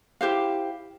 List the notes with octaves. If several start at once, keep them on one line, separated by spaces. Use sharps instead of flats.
E4 G4 C5 F5